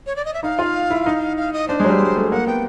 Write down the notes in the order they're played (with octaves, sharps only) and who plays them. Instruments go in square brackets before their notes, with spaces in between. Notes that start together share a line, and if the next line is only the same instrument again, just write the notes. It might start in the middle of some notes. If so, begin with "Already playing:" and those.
[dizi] C#5
D5
D#5
E5
[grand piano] D#4 [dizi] F5
[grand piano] F4
E4
D#4
[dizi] F5
D#5
[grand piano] D4 [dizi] C5
[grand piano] G#3
F#3
G3
G#3
A3
[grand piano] A#3 [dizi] F#5
[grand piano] B3 [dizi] G5